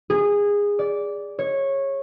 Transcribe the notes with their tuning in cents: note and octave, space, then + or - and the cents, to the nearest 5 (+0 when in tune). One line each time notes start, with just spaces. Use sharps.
G#4 -20
D5 -15
C#5 -15